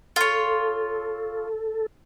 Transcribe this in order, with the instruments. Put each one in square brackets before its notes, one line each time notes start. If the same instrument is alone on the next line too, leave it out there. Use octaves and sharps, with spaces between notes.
[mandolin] F4 C#5 [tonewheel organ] A4